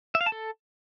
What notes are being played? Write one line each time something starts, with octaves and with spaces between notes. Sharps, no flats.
E5
F5
A5
A4